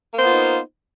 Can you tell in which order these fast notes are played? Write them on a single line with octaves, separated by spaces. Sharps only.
A#3 C5 B3 F4 D#4